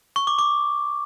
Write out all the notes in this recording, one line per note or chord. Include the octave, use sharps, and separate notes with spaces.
C#6
D6
D6